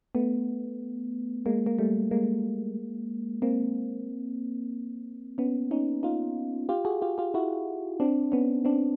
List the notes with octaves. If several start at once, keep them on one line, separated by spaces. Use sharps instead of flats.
A3 B3
G#3 A#3
A#3
G3 A3
G#3 A#3
A#3 C4
B3 C#4
C#4 D#4
D#4 F4
F4 G4
F#4 G#4
F4 G4
F4 G4
E4 F#4
C4 D4
B3 C#4
C4 D4